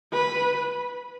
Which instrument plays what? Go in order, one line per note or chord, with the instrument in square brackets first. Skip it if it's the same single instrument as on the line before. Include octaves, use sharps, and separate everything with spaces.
[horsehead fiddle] B4